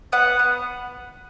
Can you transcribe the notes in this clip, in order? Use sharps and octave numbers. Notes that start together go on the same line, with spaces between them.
B3 F#5
B3